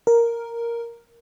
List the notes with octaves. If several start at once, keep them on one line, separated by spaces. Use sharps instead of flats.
A#4